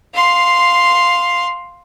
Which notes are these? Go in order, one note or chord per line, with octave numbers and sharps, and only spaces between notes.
F5 C6